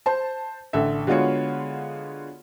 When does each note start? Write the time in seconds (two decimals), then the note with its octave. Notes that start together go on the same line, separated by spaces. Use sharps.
0.06 C5 A5
0.73 A1 D3 A4 E5
1.07 D3 G#3 B3 F4 F#4 C#5